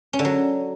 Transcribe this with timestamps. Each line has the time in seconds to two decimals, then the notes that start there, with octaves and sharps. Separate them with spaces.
0.13 C#4
0.19 D3
0.25 F#3